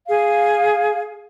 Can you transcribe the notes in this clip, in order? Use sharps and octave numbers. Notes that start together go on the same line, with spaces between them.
G#4 F5